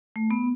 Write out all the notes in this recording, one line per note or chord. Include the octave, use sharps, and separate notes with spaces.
A3
B3